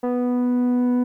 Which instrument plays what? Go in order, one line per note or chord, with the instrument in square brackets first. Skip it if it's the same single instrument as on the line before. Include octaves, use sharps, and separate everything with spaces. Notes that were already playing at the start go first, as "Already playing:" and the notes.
[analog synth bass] B3